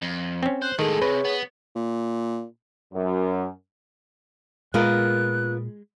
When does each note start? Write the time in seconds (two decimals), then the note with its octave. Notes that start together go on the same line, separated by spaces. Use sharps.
0.02 F2
0.43 C4 C#4
0.62 C5 F#6
0.79 A2 D#3 G#3 G#4 A4
1.02 C3 B4 C#5
1.25 B3
1.76 A#2
2.93 F#2
4.74 A#2 G#3 B3 F4 A#4 F#6